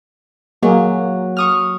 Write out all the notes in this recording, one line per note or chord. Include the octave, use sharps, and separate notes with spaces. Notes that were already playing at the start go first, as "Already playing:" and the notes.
F#3 A#3 G#4
C#6 D#6 F6